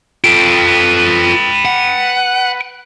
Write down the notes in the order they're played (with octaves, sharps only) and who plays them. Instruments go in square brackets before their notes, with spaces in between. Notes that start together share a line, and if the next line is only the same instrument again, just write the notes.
[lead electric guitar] F4 A4 [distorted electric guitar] B4 G5
[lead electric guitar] F#5